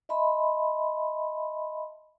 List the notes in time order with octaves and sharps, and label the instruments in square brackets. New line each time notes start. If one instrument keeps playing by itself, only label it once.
[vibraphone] D#5 E5 A5 B5 C6